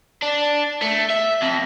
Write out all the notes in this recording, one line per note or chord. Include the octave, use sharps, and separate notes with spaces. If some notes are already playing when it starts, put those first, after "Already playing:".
D4
A3
E5
F2